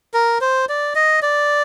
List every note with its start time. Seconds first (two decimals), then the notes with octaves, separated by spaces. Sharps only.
0.14 A#4
0.41 C5
0.69 D5
0.95 D#5
1.22 D5